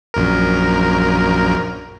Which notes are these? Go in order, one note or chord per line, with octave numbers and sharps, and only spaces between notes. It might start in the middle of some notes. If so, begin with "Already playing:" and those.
A#1 F#2 A#4